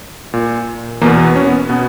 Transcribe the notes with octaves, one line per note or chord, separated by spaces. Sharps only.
A#2
E2 B2 A#3
B3
C#4
B3
B2 B3